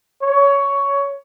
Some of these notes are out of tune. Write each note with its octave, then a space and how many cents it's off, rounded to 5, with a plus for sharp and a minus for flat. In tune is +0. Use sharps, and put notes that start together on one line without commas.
C#5 +15